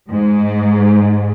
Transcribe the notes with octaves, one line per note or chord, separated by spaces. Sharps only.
G#2